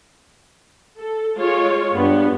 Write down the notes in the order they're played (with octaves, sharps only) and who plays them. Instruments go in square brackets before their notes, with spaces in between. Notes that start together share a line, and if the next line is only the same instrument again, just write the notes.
[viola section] A4
G#3 F4 C#5
[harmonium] G2 [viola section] B3